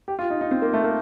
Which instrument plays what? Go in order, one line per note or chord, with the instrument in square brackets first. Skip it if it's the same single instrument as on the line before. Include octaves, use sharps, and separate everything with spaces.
[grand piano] G4
F4
D#4
D#4
C4
A#3
A3
A#3